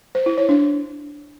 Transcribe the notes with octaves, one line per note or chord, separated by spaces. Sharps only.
C5
E4
C#5
D4